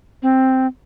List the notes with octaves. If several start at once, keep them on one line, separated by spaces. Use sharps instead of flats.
C4